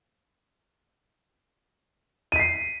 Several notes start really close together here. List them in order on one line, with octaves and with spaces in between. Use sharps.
D#7 B6 C7